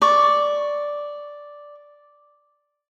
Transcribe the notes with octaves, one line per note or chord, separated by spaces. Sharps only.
D5 C#6